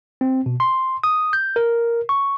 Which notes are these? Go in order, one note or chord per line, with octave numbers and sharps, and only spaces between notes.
C4
B2
C6
D#6
G6
A#4
C#6